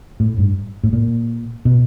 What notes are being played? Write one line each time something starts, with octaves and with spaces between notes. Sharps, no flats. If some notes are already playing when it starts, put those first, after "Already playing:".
A2
G2
A2
A#2
B2